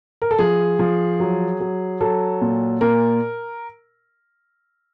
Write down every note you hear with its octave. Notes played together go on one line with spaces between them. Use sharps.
A#4
A4
F3 G#4
F3
F#3
F#3
F#3 A4
A#2
A#2 A#4